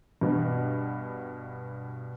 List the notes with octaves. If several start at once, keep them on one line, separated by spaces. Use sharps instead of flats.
G2 B2